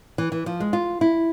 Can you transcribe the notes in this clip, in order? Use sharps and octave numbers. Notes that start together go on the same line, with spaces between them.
E3
E3
F3
G#3
F4
E4